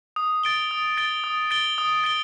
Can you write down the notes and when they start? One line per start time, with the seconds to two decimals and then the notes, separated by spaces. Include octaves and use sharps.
0.16 D#6
0.43 A6 D7 G7
0.71 D#6
0.97 A6 D7 G7
1.24 D#6
1.51 A6 D7 G7
1.78 D#6
2.04 A6 D7 G7